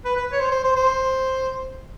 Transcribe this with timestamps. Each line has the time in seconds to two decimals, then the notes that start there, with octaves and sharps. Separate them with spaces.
0.05 B4
0.16 B4
0.32 C#5
0.40 C5
0.51 C5
0.64 C5
0.76 C5